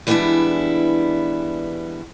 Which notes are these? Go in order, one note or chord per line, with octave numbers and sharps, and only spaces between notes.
E3 G3 G#3 B3 D4 E4